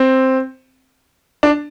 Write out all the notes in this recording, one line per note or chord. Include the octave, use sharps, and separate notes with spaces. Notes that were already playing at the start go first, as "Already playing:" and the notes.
Already playing: C4
D4